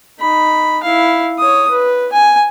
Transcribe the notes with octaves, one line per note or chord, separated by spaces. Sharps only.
D#4 B5
E4 F5
C#5 D#6
B4
G#5